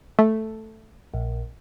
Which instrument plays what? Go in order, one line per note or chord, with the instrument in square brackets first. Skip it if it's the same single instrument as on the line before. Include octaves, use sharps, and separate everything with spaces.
[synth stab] A3
[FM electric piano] A#1